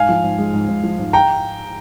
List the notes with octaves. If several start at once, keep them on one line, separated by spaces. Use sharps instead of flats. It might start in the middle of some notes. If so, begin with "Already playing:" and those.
Already playing: G#2 F5 G#5
F3
G#2
G#3
G#2
G#2
F3
G#2
G5 A#5